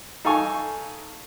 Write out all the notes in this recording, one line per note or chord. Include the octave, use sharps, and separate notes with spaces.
D#4 A4 F5 G#5 C#6